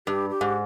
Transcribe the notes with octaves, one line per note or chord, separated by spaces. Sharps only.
G2 G4
G4
G#2